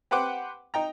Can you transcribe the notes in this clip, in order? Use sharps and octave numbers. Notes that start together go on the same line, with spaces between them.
G4 B4 C5 F#5 D6
D#4 G5 A#5